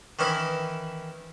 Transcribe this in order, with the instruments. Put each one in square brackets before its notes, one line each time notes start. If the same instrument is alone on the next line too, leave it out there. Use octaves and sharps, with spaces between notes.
[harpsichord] D#3 E3 C#4 D#4 E4